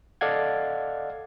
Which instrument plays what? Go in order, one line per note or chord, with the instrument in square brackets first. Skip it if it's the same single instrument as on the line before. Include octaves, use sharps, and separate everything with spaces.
[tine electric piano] A4 D5 D#5 F5 F#5 G#6